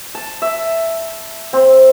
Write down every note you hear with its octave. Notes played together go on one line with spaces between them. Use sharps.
A5
E5
C4